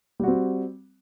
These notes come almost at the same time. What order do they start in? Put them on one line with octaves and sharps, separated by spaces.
G3 F#4 C4